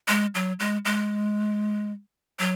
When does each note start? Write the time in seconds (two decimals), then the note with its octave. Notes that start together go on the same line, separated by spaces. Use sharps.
0.08 G#3
0.35 F#3
0.59 G#3
0.85 G#3
2.39 F#3